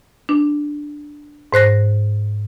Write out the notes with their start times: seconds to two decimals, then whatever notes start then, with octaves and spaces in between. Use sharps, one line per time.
0.29 D4
1.53 G#2 C5 F#6 A#6